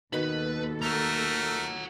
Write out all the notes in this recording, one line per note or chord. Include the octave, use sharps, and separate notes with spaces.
D#2 B2 D#3 F#4 A4 B4
A3 A#4 F#5 A#5